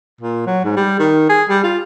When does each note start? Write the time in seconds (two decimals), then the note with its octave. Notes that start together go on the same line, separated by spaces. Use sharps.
0.21 A#2
0.46 F#3
0.64 G#2
0.76 G3
0.99 D#3
1.29 G#4
1.49 G3
1.64 F4